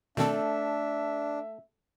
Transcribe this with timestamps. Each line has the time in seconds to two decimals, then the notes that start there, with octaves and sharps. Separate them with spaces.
0.17 B2 D#3 A3 C4 D4 A4 E5